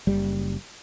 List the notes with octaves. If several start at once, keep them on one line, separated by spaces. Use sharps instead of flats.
F#1 G3